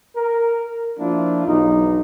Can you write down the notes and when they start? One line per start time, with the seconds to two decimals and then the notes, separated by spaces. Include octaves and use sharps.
0.16 A#4
0.99 F3 A#3 D4 E4 F4
1.46 B1 E2 D#4